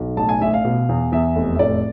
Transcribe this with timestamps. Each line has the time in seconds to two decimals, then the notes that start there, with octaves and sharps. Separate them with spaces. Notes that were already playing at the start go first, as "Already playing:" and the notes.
Already playing: B1
0.17 A1 A5
0.29 G#5
0.41 A1 E5
0.54 F5
0.65 B2
0.89 E2
1.12 E2 E5
1.36 F1
1.55 E5
1.59 A2 D5